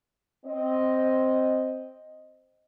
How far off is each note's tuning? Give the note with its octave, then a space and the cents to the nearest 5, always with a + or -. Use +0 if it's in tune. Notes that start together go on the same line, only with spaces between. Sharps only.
C4 +0 D#5 +0